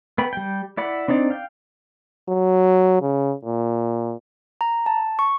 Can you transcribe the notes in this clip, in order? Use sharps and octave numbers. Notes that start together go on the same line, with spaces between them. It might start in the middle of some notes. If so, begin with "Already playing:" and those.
B3 G5 B5
G3 G5
E4 D5 F#5 B5
C4 D4 D#4 D5
F5 G5
F#3
C#3
A#2
A#5
A5
C#6